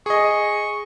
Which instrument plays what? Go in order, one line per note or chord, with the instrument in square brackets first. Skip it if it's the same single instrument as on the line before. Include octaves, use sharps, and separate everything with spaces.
[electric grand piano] G#4 D#5 [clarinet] C#6